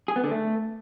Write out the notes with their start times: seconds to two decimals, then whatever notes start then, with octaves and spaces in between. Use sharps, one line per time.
0.08 G#4
0.16 B3
0.24 D3
0.31 A3